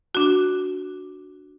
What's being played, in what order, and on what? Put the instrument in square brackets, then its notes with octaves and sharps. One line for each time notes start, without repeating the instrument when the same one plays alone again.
[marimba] D4 F#4